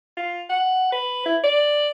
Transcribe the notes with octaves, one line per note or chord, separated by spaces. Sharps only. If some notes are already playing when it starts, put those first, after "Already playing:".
F4
F#5
B4
E4
D5